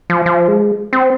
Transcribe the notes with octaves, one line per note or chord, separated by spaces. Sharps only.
F3
F3
G#3
C4